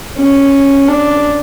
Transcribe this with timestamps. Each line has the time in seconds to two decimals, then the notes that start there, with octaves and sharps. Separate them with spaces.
0.17 C#4
0.88 D4